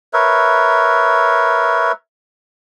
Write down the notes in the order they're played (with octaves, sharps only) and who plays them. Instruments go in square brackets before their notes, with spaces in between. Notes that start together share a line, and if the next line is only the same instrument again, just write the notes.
[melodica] A#4 B4 C#5 E5